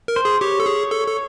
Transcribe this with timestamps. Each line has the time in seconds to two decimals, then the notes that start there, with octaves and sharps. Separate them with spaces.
0.08 A#4
0.16 C5
0.25 G#4
0.41 G4 C#5
0.60 A4
0.66 G#4
0.91 A4
1.07 A4